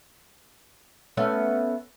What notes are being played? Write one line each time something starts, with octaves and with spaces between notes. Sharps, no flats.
A3 B3 C#4